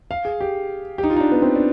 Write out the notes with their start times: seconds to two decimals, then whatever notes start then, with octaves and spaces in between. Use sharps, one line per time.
0.11 F5
0.25 G#4
0.41 G4
0.98 G4
1.03 D#4
1.10 F4
1.16 D#4
1.20 D4
1.32 B3
1.42 C4
1.55 D4